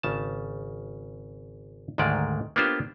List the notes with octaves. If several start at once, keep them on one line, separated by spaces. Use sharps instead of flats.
G#1 C#3 A5
D2 G#2 D#3 G#3 D5
A#3 B3 D4 F4 G4 C5